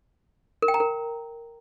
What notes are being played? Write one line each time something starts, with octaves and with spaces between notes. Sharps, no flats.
A#4
G5
A#5
A#4